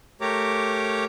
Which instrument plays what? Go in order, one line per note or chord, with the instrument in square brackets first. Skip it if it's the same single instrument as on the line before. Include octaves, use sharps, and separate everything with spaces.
[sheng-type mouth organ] A3 G4 A#4 C#5 A#5 D6